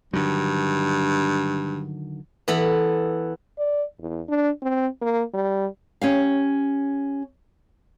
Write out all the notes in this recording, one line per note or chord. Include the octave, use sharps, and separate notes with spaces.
G2 D3 D#3 F#3
E3 B3 A4 B5
D5
E2
D4
C4
A#3
G3
C#4 G4 F5